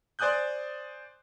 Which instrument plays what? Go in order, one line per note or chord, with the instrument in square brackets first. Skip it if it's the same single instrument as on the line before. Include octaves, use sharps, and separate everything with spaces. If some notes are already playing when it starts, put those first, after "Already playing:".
[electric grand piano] C5 D5 G#5 D#6 F#6 G6